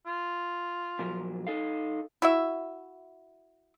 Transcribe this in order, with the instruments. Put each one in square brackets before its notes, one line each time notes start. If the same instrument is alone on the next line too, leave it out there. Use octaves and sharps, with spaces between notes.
[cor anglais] F4
[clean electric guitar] A#2 F3 F#3
D#4 A4 F5
[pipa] E4 F#4 E5